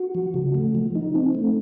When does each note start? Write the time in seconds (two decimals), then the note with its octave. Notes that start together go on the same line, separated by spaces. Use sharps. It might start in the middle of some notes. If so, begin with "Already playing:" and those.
Already playing: F#4
0.15 F3
0.34 C#3
0.55 A3
0.75 F3
0.95 D#4
1.15 C4
1.35 A3